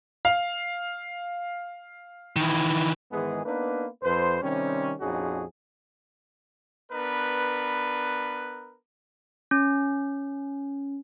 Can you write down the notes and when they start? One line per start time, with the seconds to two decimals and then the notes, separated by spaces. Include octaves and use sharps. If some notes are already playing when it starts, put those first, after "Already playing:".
0.25 F5
2.36 D#3 E3
3.12 G#2 D#3 E3 G#3 B3 G#4
3.45 A#3 B3 D4 D#4 B4
4.03 F2 B4 C5
4.42 C3 D#3 G3 C4 C#4
5.01 A#1 F2 C#4 D#4 F#4 G#4
6.92 B3 D4 A#4 B4
9.51 C#4